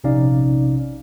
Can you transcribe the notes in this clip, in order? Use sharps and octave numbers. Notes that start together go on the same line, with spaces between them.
A#1 C3 C#4 D#4 D5 F5